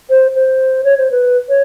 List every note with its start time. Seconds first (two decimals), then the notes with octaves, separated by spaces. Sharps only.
0.10 C5
0.36 C5
0.84 C#5
0.98 C5
1.11 B4
1.49 C#5